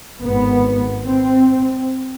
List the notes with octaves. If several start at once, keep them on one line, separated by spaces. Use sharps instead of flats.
G#1 G#2 B3
C4